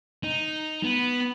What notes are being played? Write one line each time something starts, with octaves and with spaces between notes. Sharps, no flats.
D#4
B3